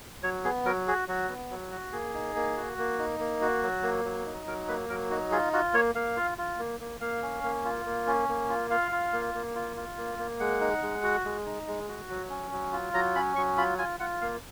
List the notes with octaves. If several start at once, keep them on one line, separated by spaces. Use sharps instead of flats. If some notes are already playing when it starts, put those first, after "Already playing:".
F#3 C#5
B3 G#4
F#3 A#4
F#4 G#4
F#3 F#4
B3
F#3
F#4
A#3 G#4
D#4
A#3
F#4
A#3
D#4
A#3
F#4
F#3
A#3
F#3
D#4
F#3 A#4
A#3 B4
F#3 A#4
D#4 F#4
F4 G#4
F4 F#4
A#3 C#5
A#3 F5
F4
F4
A#3
A#3
A#3 F5
C#4
A#3
F4
A#3
C#4
A#3
F4
F4 F5
F4
A#3
A#3
F4
F4
A#3
A#3
G#3 F#5
D#4
G#3
F#4
G#3
D#4
G#3
F#4
F#3
C#4
F#3
F4
F#3 A#5
C#4 B5
F#3 C#6
F4 B5
F4 G#5
F4 F#5
A#3 F5